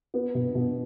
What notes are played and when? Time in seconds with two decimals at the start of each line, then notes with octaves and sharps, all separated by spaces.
0.14 B3
0.35 B2
0.55 B2